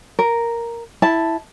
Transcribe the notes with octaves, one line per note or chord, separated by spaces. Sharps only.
A#4
E4 A5